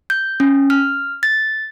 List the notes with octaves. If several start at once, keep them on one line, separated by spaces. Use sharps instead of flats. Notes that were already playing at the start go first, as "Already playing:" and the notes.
G6
C#4
F6
A6